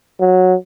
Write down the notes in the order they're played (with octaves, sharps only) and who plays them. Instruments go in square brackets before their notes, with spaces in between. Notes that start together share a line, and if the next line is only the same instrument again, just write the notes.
[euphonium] F#3